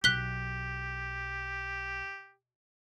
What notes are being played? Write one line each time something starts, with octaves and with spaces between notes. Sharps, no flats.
B1 G4 F#6 B6 G7